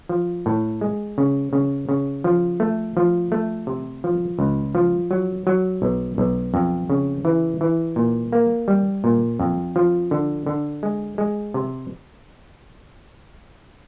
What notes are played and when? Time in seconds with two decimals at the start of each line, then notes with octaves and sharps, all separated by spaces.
0.09 F3
0.46 A2
0.81 G#3
1.18 C#3
1.53 C#3
1.89 C#3
2.24 F3
2.60 A3
2.97 F3
3.32 A3
3.67 C3
4.04 F3
4.39 C#2
4.75 F3
5.11 F#3
5.47 F#3
5.82 B1
6.18 B1
6.54 F2
6.90 C#3
7.25 E3
7.61 E3
7.96 A#2
8.33 A#3
8.68 G3
9.04 A#2
9.40 F2
9.76 F3
10.11 D3
10.46 D3
10.83 G#3
11.18 G#3
11.54 C3